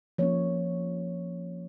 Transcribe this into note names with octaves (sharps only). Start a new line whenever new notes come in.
F3 A#3 C#4 C#5